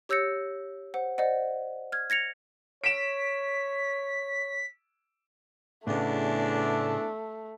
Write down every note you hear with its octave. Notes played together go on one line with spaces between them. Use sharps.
G4 C#5 E6 G6 A#6 C#7
C5 F#5
C5 D5 D#5 F#5
F6 G#6
G#6 A#6 C#7 F7
C#5 B6 D7 E7
E2 A2 C#3 A3 D4